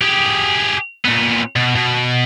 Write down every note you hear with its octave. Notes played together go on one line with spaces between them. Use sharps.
G4 G#4
A#2 B3
B2
B2